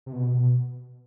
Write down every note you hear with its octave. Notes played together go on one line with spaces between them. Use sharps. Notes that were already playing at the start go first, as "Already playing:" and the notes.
C3
B2
B2